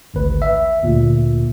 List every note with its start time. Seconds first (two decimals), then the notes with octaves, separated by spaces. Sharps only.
0.14 G#1 D2 B4
0.42 E5
0.83 D2 A#2